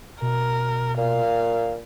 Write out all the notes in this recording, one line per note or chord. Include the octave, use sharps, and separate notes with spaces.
B2 A#4
A#2 F5